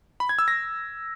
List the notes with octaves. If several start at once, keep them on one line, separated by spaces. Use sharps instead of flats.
B5
G#6
E6
A#6